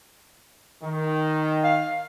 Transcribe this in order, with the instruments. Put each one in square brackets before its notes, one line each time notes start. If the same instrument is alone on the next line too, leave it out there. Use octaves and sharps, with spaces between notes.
[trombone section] D#3
[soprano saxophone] F5